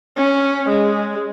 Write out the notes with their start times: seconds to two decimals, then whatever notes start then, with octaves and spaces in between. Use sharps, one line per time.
0.17 C#4
0.69 G#3